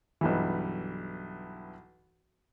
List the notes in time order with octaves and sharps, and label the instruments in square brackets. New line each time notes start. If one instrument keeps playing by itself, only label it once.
[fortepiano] B1 G2 E3